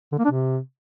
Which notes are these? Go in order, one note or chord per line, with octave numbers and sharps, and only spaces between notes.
D3
A#3
D4
C3